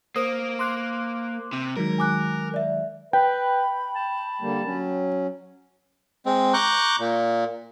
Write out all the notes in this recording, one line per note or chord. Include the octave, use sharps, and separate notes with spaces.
A#3 C5 D#6
C6 D6 F#6
C3
D#3 F#3 G#3 A#4
G#5 D6 F#6
D5 E5
B4 G5 B5
A5
D3 G3 A#3
F#3 C#4
G#3 C4
A#5 C#6 D6 F#6 G6
A#2